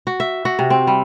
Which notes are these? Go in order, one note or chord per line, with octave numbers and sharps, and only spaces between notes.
F#4
E5
F#4
C3
C4
G3